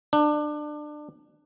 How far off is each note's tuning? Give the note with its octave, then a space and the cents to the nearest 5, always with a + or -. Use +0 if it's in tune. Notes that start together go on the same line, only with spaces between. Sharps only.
D4 +25